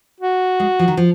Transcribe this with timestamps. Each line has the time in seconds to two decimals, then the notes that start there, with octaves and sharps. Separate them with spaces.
0.21 F#4
0.60 G#3
0.79 F3
0.88 D#3
0.97 F3